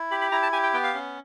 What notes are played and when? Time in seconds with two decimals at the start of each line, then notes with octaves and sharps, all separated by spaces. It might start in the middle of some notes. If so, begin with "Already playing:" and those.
Already playing: E4
0.11 G4 B5
0.21 B5
0.32 E4 A#5
0.43 A5
0.53 G4 G#5
0.63 G5
0.74 B3 G5
0.84 F5
0.94 C#4